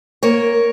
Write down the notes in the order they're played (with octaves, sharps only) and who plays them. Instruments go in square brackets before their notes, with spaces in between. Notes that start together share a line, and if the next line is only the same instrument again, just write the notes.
[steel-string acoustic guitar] A#3 A#4 C#5